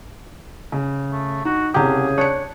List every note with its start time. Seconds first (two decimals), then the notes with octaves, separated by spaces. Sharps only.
0.72 C#3
1.11 A3
1.45 D#4 F#4
1.74 C2 C#3 G4 G#4 A#5 G6
2.18 D4 C#5 A5 F#6 C#7